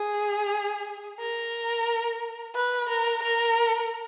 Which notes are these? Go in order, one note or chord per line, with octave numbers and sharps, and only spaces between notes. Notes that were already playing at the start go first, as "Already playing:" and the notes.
Already playing: G#4
A#4
B4
A#4
A#4